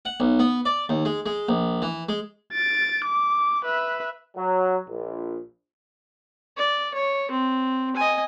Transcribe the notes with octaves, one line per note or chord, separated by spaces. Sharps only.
F#5
B1
B3
D5
D#2
G#3
G#3
A#1
E3
G#3
A6 D7
D6
B4 E5
F#3
A#1
D5
C#5
C4
D#5 G#5